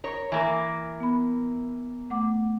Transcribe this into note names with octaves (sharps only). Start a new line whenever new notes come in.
A#4 C#5
E3 A#3 A#4
B3 B5
A3 F#5 D6